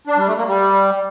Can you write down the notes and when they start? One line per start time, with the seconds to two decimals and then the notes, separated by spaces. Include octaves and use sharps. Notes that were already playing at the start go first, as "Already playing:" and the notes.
0.07 D4
0.17 G3
0.27 A3
0.37 A#3
0.47 G3